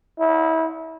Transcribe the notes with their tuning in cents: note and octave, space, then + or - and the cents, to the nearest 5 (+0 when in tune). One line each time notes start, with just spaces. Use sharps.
E4 -30